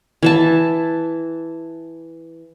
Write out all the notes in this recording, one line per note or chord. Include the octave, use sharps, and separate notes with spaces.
E3 E5 A5